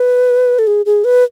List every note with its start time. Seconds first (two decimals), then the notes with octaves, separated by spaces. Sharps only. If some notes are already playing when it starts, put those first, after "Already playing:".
Already playing: B4
0.59 A4
0.67 G#4
0.86 G#4
1.04 B4